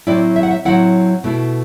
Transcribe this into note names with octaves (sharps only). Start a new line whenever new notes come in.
A2 F#3 C4 E4 D5
E5
F#5
E5
A2 F#3 C4 E4 F#5
B2 A3 E4